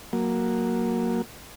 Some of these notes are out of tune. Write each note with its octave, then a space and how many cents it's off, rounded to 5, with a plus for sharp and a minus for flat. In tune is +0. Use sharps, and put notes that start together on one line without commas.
F#3 +0 A#3 +0